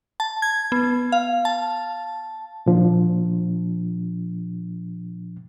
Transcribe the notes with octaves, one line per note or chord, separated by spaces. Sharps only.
A5
G#6
B3
F5
A5
A#2 F3 D4